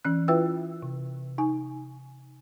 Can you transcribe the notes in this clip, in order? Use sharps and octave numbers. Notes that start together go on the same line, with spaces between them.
E3 C#4 F#6
E4 F4 B4 E5 G5 E6
C3
D#4 G#5